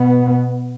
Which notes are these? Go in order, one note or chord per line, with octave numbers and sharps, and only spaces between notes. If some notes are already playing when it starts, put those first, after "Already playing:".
Already playing: B2 B3